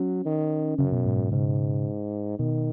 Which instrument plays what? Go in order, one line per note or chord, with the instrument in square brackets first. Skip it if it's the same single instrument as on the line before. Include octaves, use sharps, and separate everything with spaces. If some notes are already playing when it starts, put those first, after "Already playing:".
Already playing: [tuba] F#3 [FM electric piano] C#4
[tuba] D#3
[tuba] F#2 [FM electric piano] C#3
[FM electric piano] B2
G#2
B2
[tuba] G#2 [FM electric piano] C#3
[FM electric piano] B2 [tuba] D#3